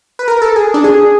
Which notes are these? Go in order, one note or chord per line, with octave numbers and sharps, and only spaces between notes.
B4
A#4
A4
G#4
D4
G#4